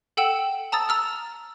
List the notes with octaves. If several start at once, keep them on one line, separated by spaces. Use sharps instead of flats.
A4 F#5 G5 E6 E7 F#7
A5 A#5 D#6 E6 A6
A#5 E6 F6